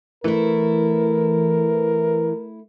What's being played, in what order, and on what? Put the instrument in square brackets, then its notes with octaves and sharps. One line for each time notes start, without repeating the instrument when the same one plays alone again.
[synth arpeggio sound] E3 [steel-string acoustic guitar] A3 E4 [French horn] A#4